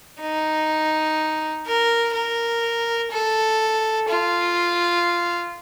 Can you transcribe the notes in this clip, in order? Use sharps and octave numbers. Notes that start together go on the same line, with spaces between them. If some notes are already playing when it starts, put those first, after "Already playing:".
D#4
A#4
A#4
A4
F4